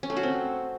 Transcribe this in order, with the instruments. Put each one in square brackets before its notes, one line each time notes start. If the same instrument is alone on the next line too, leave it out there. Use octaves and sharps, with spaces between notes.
[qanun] C#4
A3
F#4
C4